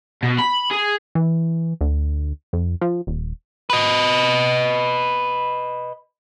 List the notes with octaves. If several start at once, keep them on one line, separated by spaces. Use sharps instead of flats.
B2
B5
G#4
E3
D2
F2
F3
D#1
B4 D#5